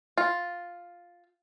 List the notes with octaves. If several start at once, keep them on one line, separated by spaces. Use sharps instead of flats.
F4